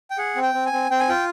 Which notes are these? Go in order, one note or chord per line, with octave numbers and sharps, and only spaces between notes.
G5
G#4 F#5
C4
G5
C4
G#5
C4
C4 G5
G#5
F4 G5